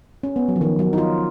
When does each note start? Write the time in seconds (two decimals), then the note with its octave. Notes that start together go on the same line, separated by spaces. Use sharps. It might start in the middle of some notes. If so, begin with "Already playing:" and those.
0.23 C#4
0.36 B3
0.48 F#3
0.56 F3
0.61 D#3
0.79 F#3
0.93 D#4
0.98 F4